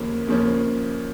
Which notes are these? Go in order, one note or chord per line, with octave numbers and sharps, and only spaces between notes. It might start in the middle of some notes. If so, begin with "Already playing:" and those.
Already playing: D#2 C#3 F3 A#3 C#4
D#2 C#3 F3 A#3 C#4